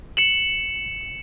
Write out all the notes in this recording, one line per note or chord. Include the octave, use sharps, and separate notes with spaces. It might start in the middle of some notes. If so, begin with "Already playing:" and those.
C#7 E7 F#7